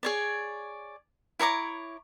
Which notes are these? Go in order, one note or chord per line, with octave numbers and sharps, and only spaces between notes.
G#4 C#5 D5
E4 C#5 A#5 D6